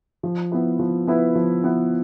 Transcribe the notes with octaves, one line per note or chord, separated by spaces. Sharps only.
F3
B3 E4 B4
F3
B3 E4 B4
F3
B3 E4 B4